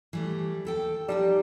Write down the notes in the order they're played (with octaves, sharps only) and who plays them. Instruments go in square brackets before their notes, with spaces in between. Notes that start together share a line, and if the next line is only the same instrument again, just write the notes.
[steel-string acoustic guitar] E3 G3 A3
D#2 A4 G5
[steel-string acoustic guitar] F3 D#4 A5 [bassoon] G3